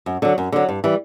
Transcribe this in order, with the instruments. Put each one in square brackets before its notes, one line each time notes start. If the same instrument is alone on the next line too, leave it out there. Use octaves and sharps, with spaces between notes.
[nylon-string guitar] F#2
D3 F#3
F#2
D3 F#3
G2
E3 G3